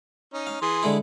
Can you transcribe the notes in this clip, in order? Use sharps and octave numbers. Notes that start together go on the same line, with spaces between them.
C#4 D#4
F5
E3 G#4 C6
D3 G#3 E4